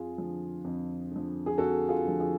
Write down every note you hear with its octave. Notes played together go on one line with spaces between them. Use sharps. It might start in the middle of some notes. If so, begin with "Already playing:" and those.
Already playing: F2 F4 G#4
D3 F3
F2
D3 F3
G#4
F2 F#4 A4
F4 G#4
D3 F3
F4 G#4